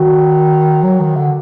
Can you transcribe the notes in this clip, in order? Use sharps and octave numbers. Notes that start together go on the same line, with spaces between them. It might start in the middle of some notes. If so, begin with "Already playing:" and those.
Already playing: D#3 F#4
F#3
D#3
D3